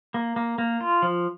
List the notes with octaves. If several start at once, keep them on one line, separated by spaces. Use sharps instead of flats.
A#3
A#3
A#3
F4
F3